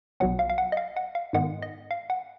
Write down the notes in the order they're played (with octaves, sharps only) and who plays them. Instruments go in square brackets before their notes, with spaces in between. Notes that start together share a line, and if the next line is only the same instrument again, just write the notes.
[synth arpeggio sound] B1 B2 F#3 B3 F#5
F5
F5
F#5
D#5
F5
F#5
F5
G#2 D#3 G#3 B3 F#5
D#5
F5
F#5